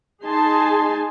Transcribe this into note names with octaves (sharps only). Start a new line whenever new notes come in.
D#4 G#4 G#5 A5 C6